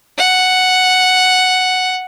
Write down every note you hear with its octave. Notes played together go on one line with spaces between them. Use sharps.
F#5